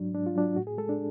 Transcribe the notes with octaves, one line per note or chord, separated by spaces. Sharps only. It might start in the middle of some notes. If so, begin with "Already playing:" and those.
Already playing: G#2 F#3 D4
G#2 D4
F4
F#3 D4
A2 F#4
G#4
G#3 A4
D4